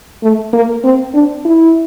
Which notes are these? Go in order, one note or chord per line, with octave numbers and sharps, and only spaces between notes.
A3
A#3
C4
D4
E4